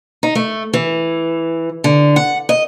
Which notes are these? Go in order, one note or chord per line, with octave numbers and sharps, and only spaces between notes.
D#4
A3
E3
D3
F#5
D#5